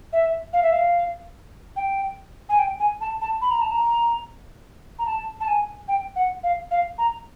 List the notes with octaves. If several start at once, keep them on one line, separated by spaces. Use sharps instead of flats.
E5
F5
E5
F5
G5
G#5
G5
G#5
A5
A5
B5
A#5
A5
A#5
A#5
A5
A5
G#5
G5
F#5
F5
F5
A#5